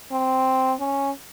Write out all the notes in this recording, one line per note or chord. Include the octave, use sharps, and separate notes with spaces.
C4
C#4